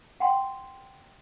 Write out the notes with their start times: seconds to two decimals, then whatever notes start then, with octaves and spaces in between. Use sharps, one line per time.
0.20 F#5 G5 C6